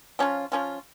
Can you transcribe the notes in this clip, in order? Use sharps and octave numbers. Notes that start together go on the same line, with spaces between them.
F3 C#4 F4
F3 C#4 F4